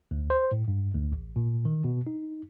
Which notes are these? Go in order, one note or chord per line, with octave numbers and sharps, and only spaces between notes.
D2
C5
A2
G2
D2
A1
A#2
D#3
B2
D#4